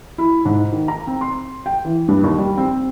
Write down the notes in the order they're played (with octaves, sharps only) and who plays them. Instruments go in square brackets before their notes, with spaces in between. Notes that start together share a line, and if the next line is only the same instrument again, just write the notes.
[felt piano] E4
G#2
D#3
A#5
C4
C6
G5
E3
G2
D#2
G3
C4